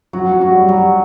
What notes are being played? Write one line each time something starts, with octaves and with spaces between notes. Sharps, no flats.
F#3 F#4
F#3
F#4
G3
F#3 G3